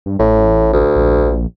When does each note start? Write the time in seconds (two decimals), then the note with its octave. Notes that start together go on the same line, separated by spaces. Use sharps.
0.06 G2
0.19 A1 A2
0.73 D2
0.96 A#1